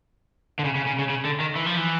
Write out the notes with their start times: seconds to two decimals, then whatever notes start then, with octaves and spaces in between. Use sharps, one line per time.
0.59 D3
0.65 C#3
0.76 C#3
0.87 C#3
0.99 C#3
1.09 C#3
1.25 D3
1.40 D#3
1.56 E3
1.66 F3
1.77 E3